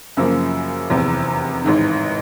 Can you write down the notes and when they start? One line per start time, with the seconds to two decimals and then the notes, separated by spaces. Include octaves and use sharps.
0.17 F#2 C#3 F3 A#3
0.90 F1 E2 C3
1.64 A1 G#2 D#3